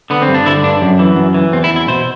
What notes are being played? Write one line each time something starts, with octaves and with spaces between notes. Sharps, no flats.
D3 B3
C4
G2
D4
D3 E4
G2 D4
F#2
E3
F#2
E3
E2 C4
E4
E2
E4
B2 C5